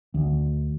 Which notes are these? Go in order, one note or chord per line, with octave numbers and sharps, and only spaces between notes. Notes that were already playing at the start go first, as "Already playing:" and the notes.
D2